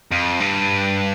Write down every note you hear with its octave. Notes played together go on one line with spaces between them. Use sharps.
F2
G2